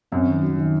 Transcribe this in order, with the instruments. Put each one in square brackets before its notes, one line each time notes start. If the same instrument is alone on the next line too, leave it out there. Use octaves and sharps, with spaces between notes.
[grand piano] F#2 [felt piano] C4
[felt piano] D#3
F#3
D#3